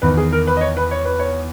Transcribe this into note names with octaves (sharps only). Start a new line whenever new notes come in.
E2 D#3 B4
G#4
A#4
B4
D#5
C#5
B4
C#5
B4
C#5